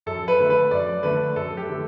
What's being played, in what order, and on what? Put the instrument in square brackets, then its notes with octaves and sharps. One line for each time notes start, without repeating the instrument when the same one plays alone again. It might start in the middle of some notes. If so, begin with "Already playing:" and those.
[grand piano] F#2 A4
B4
D3 A3
B4
F#2 D5
D3 A3 B4
F#2 A4
G4
D3 A3